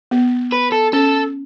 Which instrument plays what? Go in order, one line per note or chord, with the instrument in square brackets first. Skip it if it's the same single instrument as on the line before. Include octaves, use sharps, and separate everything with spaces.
[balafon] B3
[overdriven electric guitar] B4
A4
[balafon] C#4 [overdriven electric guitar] A4